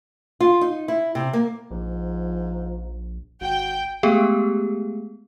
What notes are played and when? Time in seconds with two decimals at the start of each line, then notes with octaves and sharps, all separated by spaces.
0.40 F4
0.61 D#4
0.88 E4
1.15 C3
1.33 A#3
1.71 A#1 G#2 F3
3.41 G#1 F#4 G5
4.03 G#3 A3 B3 G4 G#4